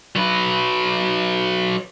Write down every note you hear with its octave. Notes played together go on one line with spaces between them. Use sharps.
F#3 B4